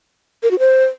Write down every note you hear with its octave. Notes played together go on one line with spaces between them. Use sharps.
A#4
F#4
C5